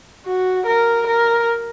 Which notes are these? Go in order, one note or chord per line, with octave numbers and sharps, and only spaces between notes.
F#4
A#4
A#4